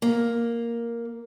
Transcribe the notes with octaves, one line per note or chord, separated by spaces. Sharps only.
A#3